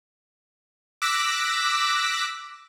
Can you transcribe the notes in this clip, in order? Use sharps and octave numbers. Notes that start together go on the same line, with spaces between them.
D6 E6 F#6 A#6 B6